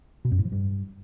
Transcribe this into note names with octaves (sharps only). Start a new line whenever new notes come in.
B2
F#2
A2
F3
G2